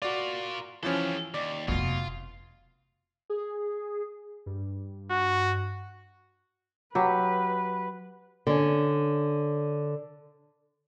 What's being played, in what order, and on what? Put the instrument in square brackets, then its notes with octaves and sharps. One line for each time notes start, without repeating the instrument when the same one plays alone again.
[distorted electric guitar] F4 A#4 [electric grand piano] F#4 D5
[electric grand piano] E3 F3 C#4 [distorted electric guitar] G4 A4
[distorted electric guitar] D#2 [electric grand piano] D5
[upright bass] F1 D3 [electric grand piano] B2 [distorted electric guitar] F4
[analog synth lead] G#4
G2
[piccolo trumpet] F#4
[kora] F#3 G4 [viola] B4
[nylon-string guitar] D3 C#4